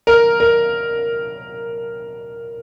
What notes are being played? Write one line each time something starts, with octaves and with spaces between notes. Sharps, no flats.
A#4
A#4